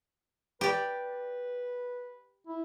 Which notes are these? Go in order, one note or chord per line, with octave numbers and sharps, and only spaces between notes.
G4 B4 D5
E4